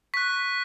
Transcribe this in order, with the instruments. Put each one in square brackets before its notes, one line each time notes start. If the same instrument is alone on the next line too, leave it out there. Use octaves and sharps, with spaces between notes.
[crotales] C#6 F#6 B6